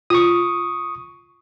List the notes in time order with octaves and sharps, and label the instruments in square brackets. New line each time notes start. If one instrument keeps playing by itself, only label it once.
[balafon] F4 [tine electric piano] C#6 D#6